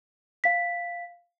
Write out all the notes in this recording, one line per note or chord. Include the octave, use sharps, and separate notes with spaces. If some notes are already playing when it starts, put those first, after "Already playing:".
F5 B6